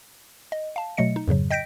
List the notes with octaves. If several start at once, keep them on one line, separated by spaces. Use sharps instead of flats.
D#5
F5 A5
B2 F#3 A3 D#5 C#7
D#4
F2 G#2 C#3 F#3
D#5 G5 G6 A#6 B6 D7